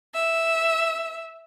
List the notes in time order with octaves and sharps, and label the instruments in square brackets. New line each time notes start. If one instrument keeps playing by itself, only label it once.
[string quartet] E5